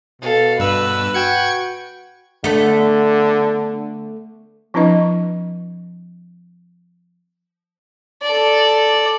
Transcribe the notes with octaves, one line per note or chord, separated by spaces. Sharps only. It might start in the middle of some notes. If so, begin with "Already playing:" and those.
B2 A4 F5
G2 B4 E6
F#4 G5 G#6 C#7
D3 A3 B3
F3 C4 D4 E4 B4 D#5
A4 D5